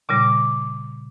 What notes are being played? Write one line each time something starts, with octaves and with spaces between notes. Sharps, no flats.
A#2 C#3 G3 D6